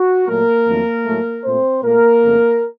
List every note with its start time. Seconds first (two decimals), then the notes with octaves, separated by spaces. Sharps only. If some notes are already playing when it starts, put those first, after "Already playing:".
Already playing: F#4
0.28 A#2 F#3 A3 A#3 A#4
0.67 F2 D#3 F#3 A3
1.05 A2 F#3 A3
1.45 A#2 A3 C4 C5
1.83 A#2 A3 A#3 A#4
2.23 F2 C#3 A3